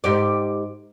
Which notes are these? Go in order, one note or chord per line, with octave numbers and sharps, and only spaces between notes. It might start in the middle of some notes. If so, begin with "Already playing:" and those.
G#2 G4 D5